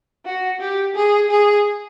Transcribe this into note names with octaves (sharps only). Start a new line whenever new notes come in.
F#4
G4
G#4
G#4